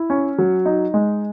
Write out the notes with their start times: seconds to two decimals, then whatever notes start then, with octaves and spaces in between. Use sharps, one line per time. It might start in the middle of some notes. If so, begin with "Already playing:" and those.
Already playing: E4
0.10 C#4
0.38 F#3
0.66 D#4
0.94 G#3